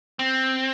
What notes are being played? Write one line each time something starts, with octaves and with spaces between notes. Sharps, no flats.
C4